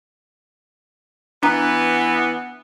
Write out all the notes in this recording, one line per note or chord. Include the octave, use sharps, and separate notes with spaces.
E3 B3 D4 A#5